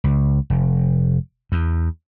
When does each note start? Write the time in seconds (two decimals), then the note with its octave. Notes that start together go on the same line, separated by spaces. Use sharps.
0.04 C#2
0.50 F1
1.52 E2